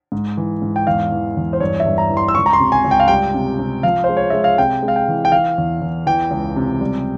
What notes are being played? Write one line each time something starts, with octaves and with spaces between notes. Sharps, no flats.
G#2
E3
G#2
G5
E2 F5
E3
E2
C5
G2 C#5
E5
G2
A#5
E3
C6
E6
C#2 C#6
A#5
C6
C3
G#5
C#2
G5
F5
G3 G5
C3
C3
F3 F5
C5
G#3
C#5
G#3 E5
F5
C3 G5
G#3
F5
G5
E3
G5
E3 F5
E2
E2
E3 G5
C#2
C3
G3